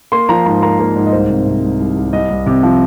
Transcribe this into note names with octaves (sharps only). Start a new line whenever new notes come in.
A#3 C6
F3 A#5
G#2 A#5
A#3 A#5
A#3
G#2
D#5
C2 C5
C3
C3
C2
C2
C2
C2 D#5
C2
C3
F3